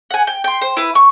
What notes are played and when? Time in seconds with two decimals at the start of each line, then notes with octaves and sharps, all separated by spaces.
0.10 F#5 G#5
0.27 G5
0.44 G5 C6
0.62 C5
0.77 E4 B4
0.95 C#6